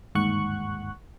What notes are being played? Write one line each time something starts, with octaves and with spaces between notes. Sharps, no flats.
G1 D#2 G#2 F#5 C#6 F#6